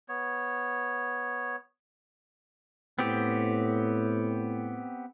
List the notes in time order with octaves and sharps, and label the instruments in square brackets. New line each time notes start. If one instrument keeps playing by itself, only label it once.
[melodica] B3 C#5
[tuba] A2 [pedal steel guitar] B3 C4 G4